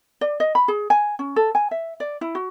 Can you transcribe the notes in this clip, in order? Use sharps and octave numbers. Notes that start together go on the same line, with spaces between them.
D5
D#5
B5
G#4
G#5
C#4
A4
G#5
E5
D5
E4
F#4